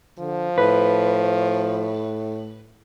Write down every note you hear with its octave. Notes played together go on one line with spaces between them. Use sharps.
D3 F3
A2 B4